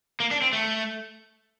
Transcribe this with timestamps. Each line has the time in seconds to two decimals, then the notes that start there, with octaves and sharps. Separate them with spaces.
0.20 A#3
0.31 D4
0.42 C4
0.53 A3